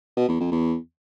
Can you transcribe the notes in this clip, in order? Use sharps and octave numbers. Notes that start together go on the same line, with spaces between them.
B2
E2
F2
E2